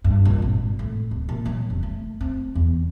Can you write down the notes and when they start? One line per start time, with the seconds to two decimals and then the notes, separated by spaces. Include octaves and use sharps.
0.04 G2
0.25 A#1
0.42 G#1
0.79 A2
1.11 D1
1.29 A#2
1.45 F#3
1.70 F1
1.83 A3
2.21 C4
2.55 E2